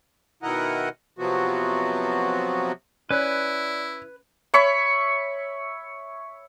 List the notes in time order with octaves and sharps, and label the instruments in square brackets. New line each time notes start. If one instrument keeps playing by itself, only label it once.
[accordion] B2 D#3 E4 A#4 D#5 F#5
C3 F3 F#3 B3 F#4
[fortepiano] C#4 [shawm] E4 [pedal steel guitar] B4 F#6 [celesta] D5
[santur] C#5 E5 B5 C#6